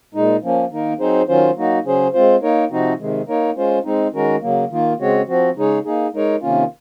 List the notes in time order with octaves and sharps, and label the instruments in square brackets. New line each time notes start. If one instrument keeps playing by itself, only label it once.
[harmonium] A#2 G#3 D#4
F3 A#3 C#4
D#3 A#3 D#4 A#4
F#3 C4 D#4 G#4 C5
D#3 F#3 C#4 F4 C5
F#3 A#3 D#4 F#4
C#3 F#3 C#4 G#4 C5
G#3 C4 F4 C5
A#3 D#4 A#4 C#5
C3 F3 C4 D#4 F#4
C3 D#3 G#3
A#3 D#4 A#4 C#5
G#3 C#4 F4 C5
G#3 C4 D#4
D#3 G#3 C#4 F#4 A#4
C#3 F#3 A#3
D#3 A#3 F4
C#3 G#3 C4 F#4 C#5
F3 C4 F#4
C#3 G#3 D#4 G#4 C#5
A#3 D#4 G#4
G#3 D#4 A#4 C#5
C3 D#3 A#3 C#4 F4